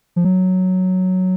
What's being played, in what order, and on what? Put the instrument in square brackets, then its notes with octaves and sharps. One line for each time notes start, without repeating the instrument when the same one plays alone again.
[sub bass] F3
F#3